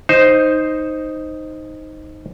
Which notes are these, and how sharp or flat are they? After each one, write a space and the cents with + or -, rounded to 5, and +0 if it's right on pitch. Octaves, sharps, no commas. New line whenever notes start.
D#4 +0 C5 +0